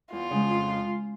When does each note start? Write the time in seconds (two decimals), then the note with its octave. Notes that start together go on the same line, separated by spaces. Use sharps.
0.12 E2 F4
0.31 C#3 F3 G#3
0.50 F2